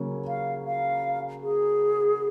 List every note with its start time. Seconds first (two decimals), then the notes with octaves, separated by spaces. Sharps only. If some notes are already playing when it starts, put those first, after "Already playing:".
Already playing: C#3 F#3 A#3 C#4
0.28 F5
0.66 F5
1.42 G#4